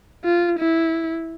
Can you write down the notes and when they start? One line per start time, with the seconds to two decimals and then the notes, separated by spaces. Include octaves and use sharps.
0.24 F4
0.59 E4